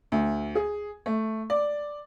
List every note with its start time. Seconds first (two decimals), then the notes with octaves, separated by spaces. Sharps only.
0.12 D2
0.55 G#4
1.06 A3
1.50 D5